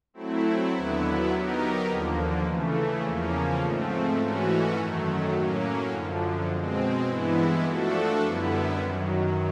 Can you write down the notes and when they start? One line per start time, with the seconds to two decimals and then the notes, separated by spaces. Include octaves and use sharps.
0.14 F#3 A3 C4 E4
0.72 D#2 D3 F#3 B3 E4
1.30 F#3 B3 D#4 G4 A#4
1.87 D#2 D3 F3 A#3
2.45 C#3 E3 A3
3.02 E2 C#3 F3 A#3 C#4
3.60 G#2 F3 A3 C4
4.18 G#2 E3 A3 C#4 F#4
4.75 F#2 D#3 F#3 A3
5.33 A2 F#3 A#3 C#4
5.90 F#2 D3 F3
6.49 B2 G#3 C4
7.06 G2 E3 G#3 B3 E4
7.64 F3 A3 D4 F#4 A4
8.22 F#2 D3 G3 B3 E4
8.79 F#2 D#3 F#3